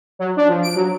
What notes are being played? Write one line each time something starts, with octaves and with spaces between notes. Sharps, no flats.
F#3
D4
F3
D7
F#3